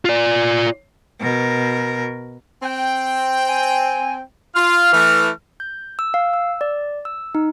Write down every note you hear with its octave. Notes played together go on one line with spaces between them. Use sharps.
F4 D5
B2 A#4
C4 G5
G#5
F4 F6
E3 A3
G6
E6
F5
E6
D5
E6
D#4